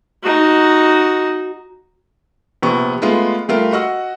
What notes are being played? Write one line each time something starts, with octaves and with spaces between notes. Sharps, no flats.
D#4 F#4
A#1 C3 B3 C#6
G#3 A3 B3 F4
G3 A3 F4 A#4
F#4 D#5 F#5 E6